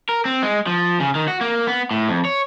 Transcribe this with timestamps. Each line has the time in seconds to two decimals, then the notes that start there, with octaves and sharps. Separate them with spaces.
0.09 A#4
0.25 C4
0.43 G#3
0.67 F3
1.00 C#3
1.15 D#3
1.28 F#4
1.41 A#3
1.67 B3
1.91 A2
2.09 F2
2.25 C#5